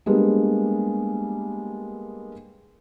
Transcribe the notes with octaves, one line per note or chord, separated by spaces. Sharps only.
G3 G#3 A#3 B3 D4